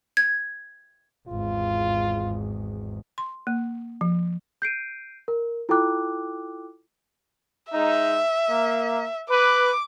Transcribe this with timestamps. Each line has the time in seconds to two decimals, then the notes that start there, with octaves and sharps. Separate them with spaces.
0.17 G#6
1.28 G#1 E2 F4
3.18 C6
3.47 A#3
4.01 F3
4.62 G6 C7 D7 D#7
5.28 A#4
5.69 E4 F4 A4 G5 D6 F#6
7.72 G#3 D#4 E5
8.49 A#3
9.30 B4 D6